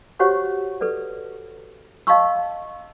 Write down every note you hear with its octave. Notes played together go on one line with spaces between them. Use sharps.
F#4 G4 C5 C#5 F#5 C#6
A4 B4 D5
D#5 F5 A5 C6 C#6 E6